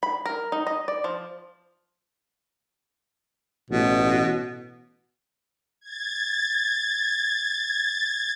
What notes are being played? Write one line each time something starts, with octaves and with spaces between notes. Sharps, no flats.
B5
A#4
D#4
D#5
D5
F3
A1 B2
G#6 A6